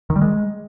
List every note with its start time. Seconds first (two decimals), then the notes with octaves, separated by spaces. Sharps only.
0.10 D#3
0.16 G3
0.21 G#3